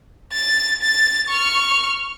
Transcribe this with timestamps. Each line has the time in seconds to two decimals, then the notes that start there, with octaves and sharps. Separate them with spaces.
0.33 A6
0.82 A6
1.28 C#6 F6